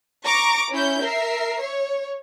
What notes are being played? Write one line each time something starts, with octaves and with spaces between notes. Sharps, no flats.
A#5 C#6 D6 D7
C#4 E4 G6
A#4 E5 C7
C#5